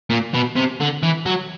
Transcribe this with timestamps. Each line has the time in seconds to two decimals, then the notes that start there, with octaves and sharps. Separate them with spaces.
0.10 A#2
0.34 B2
0.56 C3
0.81 D3
1.03 E3
1.26 F#3